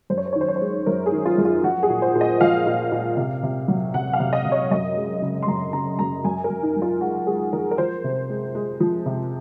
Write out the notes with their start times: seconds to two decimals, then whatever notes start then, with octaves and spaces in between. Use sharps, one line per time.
0.10 F#2 C5
0.18 C#5
0.26 C5
0.33 C#5
0.36 D#3
0.41 C5
0.48 C#5
0.56 G#3 C5
0.86 F#2 A#4
1.06 G#4
1.12 D#3
1.26 F4
1.38 F#2
1.45 F4
1.63 F3 F#4
1.83 G#4
1.89 A#2
2.02 C5
2.15 A#2
2.21 D#5
2.41 F3 F5
2.67 A#2
2.92 A#2
3.17 C3
3.43 C3
3.68 F#3
3.94 C3 F#5
4.13 F5
4.20 C3
4.33 D#5
4.45 C3
4.52 C#5
4.71 F#2 D#5
4.96 G#3
5.22 C#3
5.43 C6
5.47 F#2 A#5
5.73 C#3 A#5
5.99 F#2 A#5
6.24 F#2 G#5
6.44 A#4
6.50 F#2
6.63 D#4
6.76 F#2
6.82 F4
7.01 G#3 F#4
7.27 G#3 G#4
7.53 F3 A#4
7.71 A#4
7.78 F3 C5
8.04 C3
8.30 G#3
8.55 G#3
8.80 F3
9.06 C3